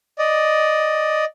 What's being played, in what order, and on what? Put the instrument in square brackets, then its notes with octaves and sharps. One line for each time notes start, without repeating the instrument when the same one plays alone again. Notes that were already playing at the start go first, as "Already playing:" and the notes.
[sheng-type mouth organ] D5 D#5